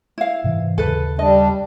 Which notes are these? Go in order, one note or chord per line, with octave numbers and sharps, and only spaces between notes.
E4 F5
G#2 C3 E3
D#2 C#3 A4 B4
G3 D4 D#5